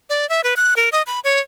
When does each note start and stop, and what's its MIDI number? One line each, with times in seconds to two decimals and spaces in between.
0.10 0.28 74
0.29 0.41 76
0.44 0.54 71
0.57 0.74 90
0.76 0.89 70
0.92 1.02 75
1.07 1.20 83
1.24 1.40 73